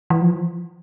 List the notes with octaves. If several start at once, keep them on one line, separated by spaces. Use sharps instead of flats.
E3
F3